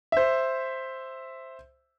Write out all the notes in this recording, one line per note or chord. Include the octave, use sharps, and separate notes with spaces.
C5 E5